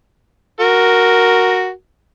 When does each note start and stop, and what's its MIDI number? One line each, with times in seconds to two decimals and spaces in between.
0.60 1.69 66
0.60 1.69 70